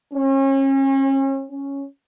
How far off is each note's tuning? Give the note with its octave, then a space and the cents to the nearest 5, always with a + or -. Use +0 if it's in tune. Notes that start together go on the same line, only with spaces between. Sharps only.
C#4 -35
C#4 +0